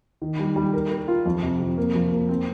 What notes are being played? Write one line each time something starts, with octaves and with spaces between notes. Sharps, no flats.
D#3
G3
G3
A#4
A#4
F4
F2
C3
F2
A#3
F3
A#3
C4